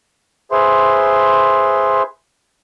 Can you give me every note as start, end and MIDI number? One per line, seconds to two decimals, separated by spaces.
0.52 2.03 68
0.52 2.03 71
0.52 2.03 72
0.52 2.03 76
0.52 2.03 84